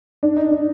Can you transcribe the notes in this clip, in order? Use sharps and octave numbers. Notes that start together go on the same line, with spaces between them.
D4
D#4
D4